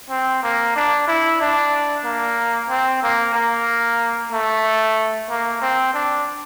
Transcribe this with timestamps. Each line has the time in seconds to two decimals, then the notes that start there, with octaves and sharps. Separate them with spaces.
0.10 C4
0.43 A#3
0.76 D4
1.08 E4
1.41 D4
2.05 A#3
2.70 C4
3.03 A#3
3.34 A#3
4.32 A3
5.30 A#3
5.62 C4
5.94 D4